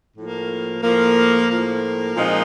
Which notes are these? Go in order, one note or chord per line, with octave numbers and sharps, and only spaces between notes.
A2 F3 A#3
A2 F3 A#3
A2 F3 A#3
A#2 F3 G#3 C4 D#4